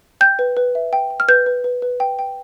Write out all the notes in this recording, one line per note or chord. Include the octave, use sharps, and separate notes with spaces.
G5 G6
B4
B4
E5
G5
G5
F6
B4 G6
B4
B4
B4
G5
G5